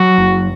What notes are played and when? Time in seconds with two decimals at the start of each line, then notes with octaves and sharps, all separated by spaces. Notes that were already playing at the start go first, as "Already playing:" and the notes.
Already playing: F#3 F#4
0.18 F#1